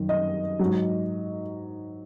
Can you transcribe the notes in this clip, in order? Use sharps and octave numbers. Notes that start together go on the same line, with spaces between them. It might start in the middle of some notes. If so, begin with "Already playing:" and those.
Already playing: F#2 D#3 F#3
D#5
G#2 F#3